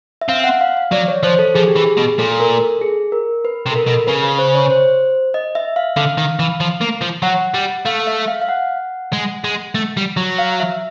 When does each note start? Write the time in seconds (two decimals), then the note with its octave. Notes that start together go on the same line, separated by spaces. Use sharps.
0.21 E5
0.29 C4 F5
0.44 F#5
0.61 F5
0.77 F5
0.92 F#3 D5
1.08 C#5
1.23 F3 C5
1.39 A4
1.54 F3 G#4
1.68 G4
1.76 E3
1.79 G#4
1.97 B2
2.18 A#2 A4
2.40 A#4
2.60 A4
2.81 G#4
3.12 A#4
3.45 B4
3.66 C3
3.72 A4
3.76 A#4
3.87 B2
4.07 C#3 B4
4.24 B4
4.38 C5
4.55 C#5
4.70 C5
5.34 D#5
5.55 E5
5.76 F5
5.96 D3 F5
6.18 D#3
6.39 E3
6.60 F3
6.81 A#3
7.01 F3
7.22 F#3 F#5
7.54 G3
7.86 A3 F5
8.07 E5
8.28 F5
8.41 F5
8.49 F#5
9.13 G#3
9.44 G#3
9.75 A3
9.97 G3
10.17 F#3
10.38 F5
10.60 E5